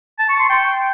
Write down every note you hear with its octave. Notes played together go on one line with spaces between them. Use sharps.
A5
C#6
C6
G5